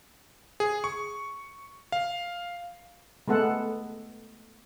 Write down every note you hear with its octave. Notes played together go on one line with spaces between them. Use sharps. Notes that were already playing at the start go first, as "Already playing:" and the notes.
G#4
C#6
F5
G#3 A3 B3 A4 F#5